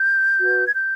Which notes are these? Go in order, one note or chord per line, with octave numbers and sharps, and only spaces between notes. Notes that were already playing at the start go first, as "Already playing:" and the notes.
Already playing: G6
F#4 B4
G#6
G6